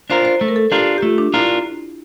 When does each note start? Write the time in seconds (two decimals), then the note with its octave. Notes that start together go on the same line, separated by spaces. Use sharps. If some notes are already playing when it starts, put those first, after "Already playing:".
0.10 D4 F4 A#4 C5
0.25 C5
0.41 A3 A4
0.48 A#4
0.56 A4
0.71 D4 F4 G4 A#4
0.98 G4
1.02 A3 F4
1.18 D4
1.33 D4 E4 F4 A#4